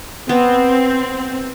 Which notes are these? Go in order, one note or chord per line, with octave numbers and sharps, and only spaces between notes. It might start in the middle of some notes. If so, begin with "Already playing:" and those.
B3 C4